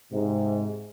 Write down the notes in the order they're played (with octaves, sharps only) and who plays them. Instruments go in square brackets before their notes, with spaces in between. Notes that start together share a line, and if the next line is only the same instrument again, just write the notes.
[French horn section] G#2 [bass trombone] C3